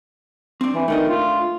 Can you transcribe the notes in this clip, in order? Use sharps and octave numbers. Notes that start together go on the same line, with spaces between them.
C4 D4
E3
D#3 A3 D4 D#5
F4